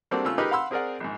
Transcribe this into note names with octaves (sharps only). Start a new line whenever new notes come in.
G3 A#3 C4 D4 F#4 A4
C#3 A3 F4 E6
D#4 G4 G#4 A#4 B4
F5 F#5 B5 C6 E6
C4 G#4 A#4 D5 F#5
A#1 G#2